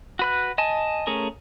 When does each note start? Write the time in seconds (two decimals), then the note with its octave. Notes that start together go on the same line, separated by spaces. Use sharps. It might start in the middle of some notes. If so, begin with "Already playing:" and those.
0.19 F#4 B4 F#6
0.58 D#5 G#5 A5
1.07 A3 C#4 G#4 A#4